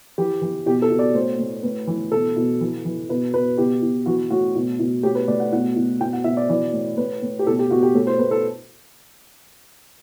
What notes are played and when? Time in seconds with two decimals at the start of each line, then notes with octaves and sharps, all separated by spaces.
0.18 E3 G4
0.42 E3
0.66 B2 G4
0.82 A4
0.90 B2
0.99 D5
1.15 A2 C5
1.39 A2
1.63 A2 B4
1.87 E3
2.12 B2 A4
2.36 B2
2.61 E3
2.85 E3
3.09 B2 B4
3.33 B2 B4
3.58 B2 G4
3.82 B2
4.06 E3 F#4
4.30 A2 F#4
4.56 B2
4.79 B2
5.03 A2 G4
5.15 B4
5.28 A2 D5
5.40 F#5
5.52 B2 F#5
5.76 B2
6.00 B2 G5
6.13 F#5
6.24 B2 E5
6.37 D5
6.49 E3 D5
6.73 A2
6.97 A2 B4
7.23 A2
7.39 G4
7.47 B2 A4
7.59 G4
7.71 B2 F#4
7.83 G4
7.94 A2 A4
8.07 C5
8.19 A2 B4
8.31 A4